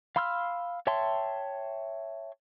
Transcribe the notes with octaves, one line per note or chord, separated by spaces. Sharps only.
F5 B5 C6 E6 F6
C#5 E5 G5 A5 C6